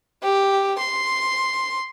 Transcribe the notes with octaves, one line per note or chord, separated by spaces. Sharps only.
G4
C6